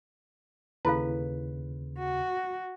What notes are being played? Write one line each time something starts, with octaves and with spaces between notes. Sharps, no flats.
D#2 C#3 E4 A4 B4 F5
F#4